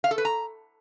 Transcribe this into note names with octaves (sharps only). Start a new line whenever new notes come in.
F5
A4
B4
A#5